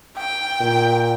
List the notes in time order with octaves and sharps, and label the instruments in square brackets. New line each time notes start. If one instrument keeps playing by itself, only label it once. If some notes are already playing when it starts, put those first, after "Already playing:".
[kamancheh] G5
[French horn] A#2